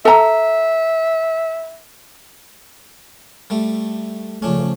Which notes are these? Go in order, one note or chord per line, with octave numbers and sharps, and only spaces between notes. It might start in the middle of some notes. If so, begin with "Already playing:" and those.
A4 E5 A#5
G3 A3
C#3 F3 A3 C#4 D4